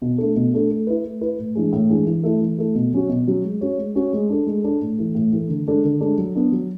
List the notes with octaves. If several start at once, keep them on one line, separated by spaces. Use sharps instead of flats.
B2
A3 D4 A4
B2
A3 D4 A4
A3
E4 B4
A3
E4 B4
A2
E3 G#3 D4 G#4
A2
E3 G#3 D4 G#4
E3
A3 E4
E3
A3 E4
B2
F#3 C#4 F#4
B2
F#3 C#4 F#4
G#3
C#4 F#4 C#5
G#3
C#4 F#4 C#5
G#3
D4 A4
G#3
D4 A4
A2
E3 A3
A2
E3 A3
D3
G#3 D4 A4
D3
G#3 D4 A4
F#3
B3 D4
F#3